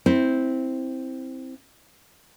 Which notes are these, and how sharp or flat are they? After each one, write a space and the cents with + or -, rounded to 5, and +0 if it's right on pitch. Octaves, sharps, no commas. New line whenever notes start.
C4 +0 E4 -15